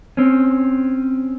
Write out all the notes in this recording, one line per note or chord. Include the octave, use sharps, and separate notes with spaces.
C4 C#4